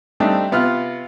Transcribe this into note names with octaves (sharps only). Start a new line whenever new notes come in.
G3 A3 C4 D4 D#4
C3 B3 F4 F6